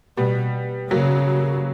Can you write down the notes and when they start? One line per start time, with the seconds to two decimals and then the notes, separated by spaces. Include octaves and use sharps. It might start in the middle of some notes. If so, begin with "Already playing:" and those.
0.17 B2 G3 B3
0.91 C#3 F#3 A#3